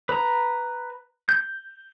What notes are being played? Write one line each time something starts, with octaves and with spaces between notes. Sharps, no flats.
B4 A#5
G6